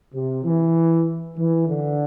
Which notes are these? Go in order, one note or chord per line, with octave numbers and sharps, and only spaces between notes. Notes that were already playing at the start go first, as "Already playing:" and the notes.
C3
E3
E3
D3